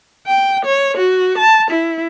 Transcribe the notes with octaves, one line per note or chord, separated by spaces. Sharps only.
G5
C#5
F#4
A5
E4